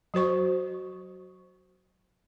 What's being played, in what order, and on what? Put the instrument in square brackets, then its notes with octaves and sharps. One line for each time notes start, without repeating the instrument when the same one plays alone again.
[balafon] F#3 F#4 C5 C#6